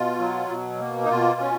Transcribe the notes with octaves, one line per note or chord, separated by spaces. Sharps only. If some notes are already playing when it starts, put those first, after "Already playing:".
Already playing: B2 F4
F#3
B2
A#3
D#4
B2 F4
C#4